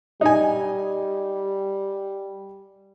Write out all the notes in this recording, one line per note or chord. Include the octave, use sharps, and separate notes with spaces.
G3 D#4 G#5